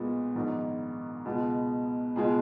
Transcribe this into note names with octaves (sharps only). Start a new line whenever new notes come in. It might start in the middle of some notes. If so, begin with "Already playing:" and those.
Already playing: B1 A#2 G#3 B3
A#1 G#2 D#3
C#2 B2 G#3
C#2 B2 G#3 G#4